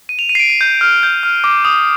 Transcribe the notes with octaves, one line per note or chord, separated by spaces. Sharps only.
D#7
F7
D#7
C7
D7
D#7
G6
F6
G6
F6
D6
D#6